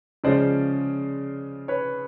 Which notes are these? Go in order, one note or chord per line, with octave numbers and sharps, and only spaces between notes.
C#3 F3 G#3 C#4 C5 D5
B4 C#5